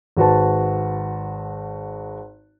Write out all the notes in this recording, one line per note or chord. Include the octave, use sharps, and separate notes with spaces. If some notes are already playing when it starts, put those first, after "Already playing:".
G#1 F#4 B4 A5